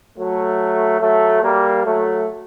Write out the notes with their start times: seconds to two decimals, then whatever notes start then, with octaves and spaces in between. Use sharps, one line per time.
0.17 F#3 A3
1.00 F#3 A3
1.42 G3 A#3
1.83 F#3 A3